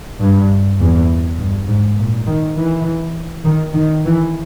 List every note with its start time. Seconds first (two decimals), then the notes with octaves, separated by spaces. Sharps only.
0.21 G2
0.80 E2
1.39 G2
1.69 G#2
1.98 A#2
2.27 D#3
2.57 E3
3.45 D#3
3.75 D#3
4.05 E3